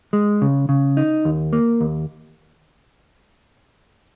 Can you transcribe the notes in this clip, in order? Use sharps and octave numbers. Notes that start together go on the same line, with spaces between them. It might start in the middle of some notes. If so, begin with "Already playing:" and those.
G#3
C#3
C#3
D#4
D#2
A#3
D#2